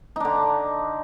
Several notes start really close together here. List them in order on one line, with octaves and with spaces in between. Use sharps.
D#4 D4 D3